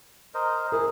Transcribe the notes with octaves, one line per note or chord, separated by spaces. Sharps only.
A#4 C5 D#5
E4 G#4 A#4